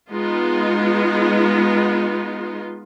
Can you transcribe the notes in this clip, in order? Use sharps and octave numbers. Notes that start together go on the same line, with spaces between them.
G#3 B3 D#4 F4